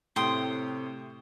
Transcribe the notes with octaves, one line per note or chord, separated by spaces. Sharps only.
A2 C3 G5 C6 D#6